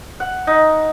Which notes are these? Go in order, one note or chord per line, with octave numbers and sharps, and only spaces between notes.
F#5
D#4